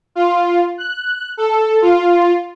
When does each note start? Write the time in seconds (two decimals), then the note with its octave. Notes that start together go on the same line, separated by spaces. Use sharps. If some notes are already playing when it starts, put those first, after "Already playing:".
0.15 F4
0.78 F#6
1.37 A4
1.82 F4